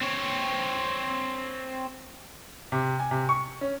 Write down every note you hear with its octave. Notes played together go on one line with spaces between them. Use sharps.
C4 C#5
C3
G#5
C3
C#6
C#4